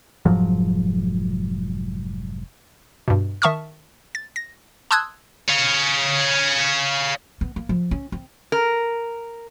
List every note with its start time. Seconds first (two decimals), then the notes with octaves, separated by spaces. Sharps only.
0.25 F1 G#2 F3 F#3
3.08 G2 B2
3.42 D#3 E5 A5 C#6 D#6 F6
4.15 A6
4.36 A#6
4.91 A5 C6 D#6 E6 F#6 G#6
5.48 C#5 F5
7.41 B3
7.56 A#3
7.69 F3
7.91 C#4
8.12 C4
8.52 A#4